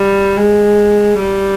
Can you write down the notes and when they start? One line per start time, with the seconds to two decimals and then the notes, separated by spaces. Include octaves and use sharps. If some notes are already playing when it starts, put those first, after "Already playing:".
Already playing: G3
0.37 G#3
1.19 G3